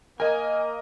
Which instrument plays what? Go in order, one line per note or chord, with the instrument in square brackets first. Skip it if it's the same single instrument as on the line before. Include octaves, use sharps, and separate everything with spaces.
[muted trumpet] A#3 [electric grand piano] A#4 D#5 [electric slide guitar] G#5